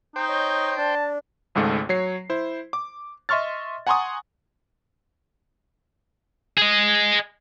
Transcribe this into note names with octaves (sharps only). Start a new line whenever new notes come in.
D#4 C5 G5
C#5 D#5
D4 A5
G#1 C#2 G#2 A3
F#3 C#5 C7
E4 C5
D6
D#5 E5 C6 C#6 F6 A6
F#5 G#5 A#5 C6 C#6 D#6
G#4 D#5